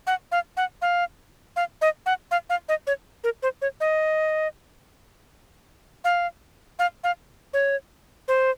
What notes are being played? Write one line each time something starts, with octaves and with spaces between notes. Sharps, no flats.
F#5
F5
F#5
F5
F5
D#5
F#5
F5
F5
D#5
C#5
A#4
C5
C#5
D#5
F5
F5
F5
C#5
C5